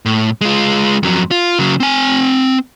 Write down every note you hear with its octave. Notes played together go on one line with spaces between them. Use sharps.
A2
G#3 F4
F2 F#3
F4
C#3 F#3
C4 G#5